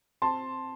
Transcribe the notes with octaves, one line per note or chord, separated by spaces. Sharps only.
C4 A5 C6